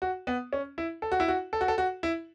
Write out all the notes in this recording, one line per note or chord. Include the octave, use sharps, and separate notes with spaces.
F#4
B3
C#4
E4
A4
F#4
E4
F#4
A4
F#4
A4
F#4
E4